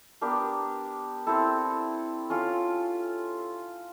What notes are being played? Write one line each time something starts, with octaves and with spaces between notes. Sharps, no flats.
B3 D4 G4 A#4
C4 E4 A4
C#4 F4 A4